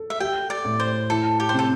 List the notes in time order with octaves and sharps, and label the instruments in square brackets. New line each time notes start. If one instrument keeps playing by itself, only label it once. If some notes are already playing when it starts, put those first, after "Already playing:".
Already playing: [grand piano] A4
[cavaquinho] E5
[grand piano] G4 [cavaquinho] G5
[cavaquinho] D5
[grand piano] A2
[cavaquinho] C5
[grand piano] E4 [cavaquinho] A4
[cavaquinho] G4
C5
[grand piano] C3 [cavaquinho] A4